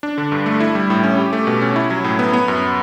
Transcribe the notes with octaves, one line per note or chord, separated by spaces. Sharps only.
D4
D3
G2
A3
E4
G3
A2
C#4
G4
A3
B2
C#4
E4
F#3
A2
B3
B3
F#2